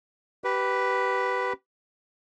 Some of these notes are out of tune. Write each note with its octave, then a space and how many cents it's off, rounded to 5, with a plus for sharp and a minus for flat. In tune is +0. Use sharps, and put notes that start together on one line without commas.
G4 -20 B4 +0